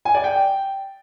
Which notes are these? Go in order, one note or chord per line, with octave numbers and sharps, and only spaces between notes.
G#5
D5
G5